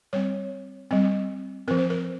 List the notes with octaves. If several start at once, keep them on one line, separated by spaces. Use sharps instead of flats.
G3 C4 C#5
G3 C4
F3 C4 A#4
C5
A#4